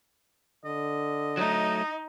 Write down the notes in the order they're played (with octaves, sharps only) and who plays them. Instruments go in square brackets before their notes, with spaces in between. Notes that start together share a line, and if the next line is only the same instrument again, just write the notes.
[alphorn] D3 [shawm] D#5
[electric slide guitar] F#3 A3 [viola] D#4